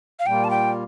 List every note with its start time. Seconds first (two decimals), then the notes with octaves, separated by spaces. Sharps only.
0.19 F5
0.26 A#2 G3 A#3 F4 G5
0.44 A5
0.50 G5